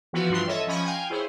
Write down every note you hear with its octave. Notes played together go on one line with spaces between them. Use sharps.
E3 F3 B3 F#4 B4
G2 E3 D4 F4 C6
A4 C#5 D#5 E5
F3 C#4 D#5 B5 C#6
F5 G5 G#5
E4 G#4 C5 C#5